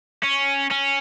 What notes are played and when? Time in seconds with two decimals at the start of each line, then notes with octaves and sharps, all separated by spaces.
0.23 C#4
0.70 C#4